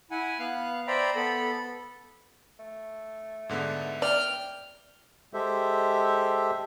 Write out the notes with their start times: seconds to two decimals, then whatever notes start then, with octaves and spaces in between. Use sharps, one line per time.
0.11 E4 F#5 G#5
0.39 B3 F5 F#6
0.87 C5 D5 E5 G5 A#5 B5
1.16 B3 A4 B5
2.59 A3
3.49 G#2 D3 B3
4.02 D5 G5 F6
5.34 G#3 G4 A4 C5 E5